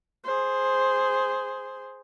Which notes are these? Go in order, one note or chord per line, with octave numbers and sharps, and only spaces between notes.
G#4 C5